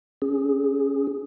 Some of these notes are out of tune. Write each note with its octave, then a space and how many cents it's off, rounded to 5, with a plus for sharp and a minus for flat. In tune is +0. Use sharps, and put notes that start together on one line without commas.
C#4 +0 G#4 -5